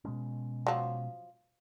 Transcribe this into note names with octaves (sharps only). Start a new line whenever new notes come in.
B2 G#3 C#4
F3 F#3